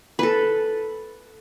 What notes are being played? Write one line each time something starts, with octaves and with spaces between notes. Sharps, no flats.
A4 B4